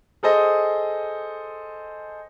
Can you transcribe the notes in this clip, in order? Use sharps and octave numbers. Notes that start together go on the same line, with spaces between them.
G#4 A4 C5 D#5